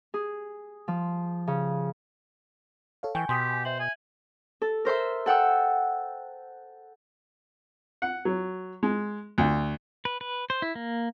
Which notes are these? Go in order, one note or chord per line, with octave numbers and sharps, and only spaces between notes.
G#4
F3
C#3
A4 C#5 F5
E3 G5 G#5 C#6 G6
B2 G4 G5 G#5 C6 D#6 B6
C5 E5 F#7
G#5
A4
A#4 C5 E5 C6
A4 F#5 G5 E6
F#5
F#3
G#3
D2
B4
B4
C5
E4
A#3